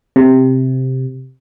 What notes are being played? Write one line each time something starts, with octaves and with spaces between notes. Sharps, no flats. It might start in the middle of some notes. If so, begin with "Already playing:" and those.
C3